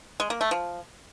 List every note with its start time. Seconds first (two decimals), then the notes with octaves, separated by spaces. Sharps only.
0.20 G#3
0.30 A#3
0.41 A3
0.51 F3